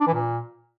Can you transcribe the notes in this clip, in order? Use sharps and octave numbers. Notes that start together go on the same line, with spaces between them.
D4
E3
A#2